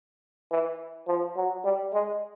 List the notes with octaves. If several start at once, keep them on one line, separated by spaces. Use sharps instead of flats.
E3
F3
F#3
G3
G#3